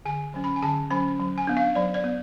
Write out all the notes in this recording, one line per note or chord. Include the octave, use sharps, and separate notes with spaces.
D3 G#5
F#3 C#4
B5
G#5
D3 A5
F#3 C#4 B5
F#3
G#5
B3 D4
F5
F#3 D5
D5
B3